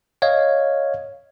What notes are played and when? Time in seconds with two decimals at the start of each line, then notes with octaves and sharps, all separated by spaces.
0.22 C#5 D#5 F5 G#6